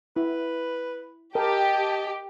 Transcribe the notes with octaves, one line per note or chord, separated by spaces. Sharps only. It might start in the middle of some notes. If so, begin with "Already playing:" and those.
E4 B4
G4 A#4 D#5 G5 A5